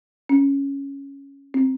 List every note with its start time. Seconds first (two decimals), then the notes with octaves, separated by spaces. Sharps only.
0.29 C#4
1.54 C4